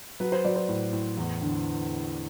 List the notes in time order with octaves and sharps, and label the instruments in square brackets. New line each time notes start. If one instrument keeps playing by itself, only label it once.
[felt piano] F#3 B4
C5
F#3 D5
C5
A2
A2
E2
D3